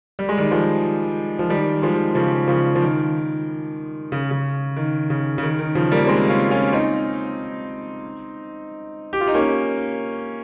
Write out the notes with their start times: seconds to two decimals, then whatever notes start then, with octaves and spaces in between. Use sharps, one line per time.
0.19 G3
0.29 G#3
0.38 D#3 G3
0.51 F3 G#3
1.39 F3
1.50 D#3 G3
1.82 F3 G#3
2.15 C#3 F3
2.48 C#3 F3
2.75 F3
2.82 D#3
4.12 C#3
4.31 C#3
4.76 D#3
5.10 C#3
5.38 C#3
5.43 D#3
5.59 D#3
5.75 C#3 F3
5.92 G3 A#3
6.07 G#3 C4
6.29 C#4 F4
6.51 C#4 F4
6.73 C4 D#4
9.13 G4
9.21 F4
9.28 D#4
9.35 A#3 C#4